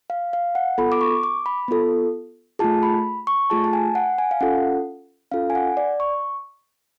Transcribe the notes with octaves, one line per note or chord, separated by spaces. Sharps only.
F5
F5
F#5
B3 F4 A4 B5
D6
C#6
D6
B5
B3 F4 A4
A3 F4 G#4 A5
B5
C#6
A3 F4 G#4 A5
A5
G#5
F#5
G#5
F5
C#4 F4 A4 F#5
C#4 F4 A4 F5
G#5
F#5
D5
C#6